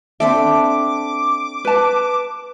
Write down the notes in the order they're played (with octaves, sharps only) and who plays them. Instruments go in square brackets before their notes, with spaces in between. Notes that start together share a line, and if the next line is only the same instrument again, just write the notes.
[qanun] C4 D4 A4 [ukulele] E5 [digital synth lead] D6
[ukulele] B4 A5